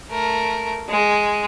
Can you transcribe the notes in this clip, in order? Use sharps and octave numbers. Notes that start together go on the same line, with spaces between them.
A3 A#4
G#3